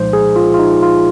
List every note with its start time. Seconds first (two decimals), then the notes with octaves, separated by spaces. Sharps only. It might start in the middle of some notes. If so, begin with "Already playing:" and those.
Already playing: C2 A#2 F3 G#3 D#4 C5
0.13 G#4
0.36 F4
0.54 F4
0.59 D#4
0.82 F4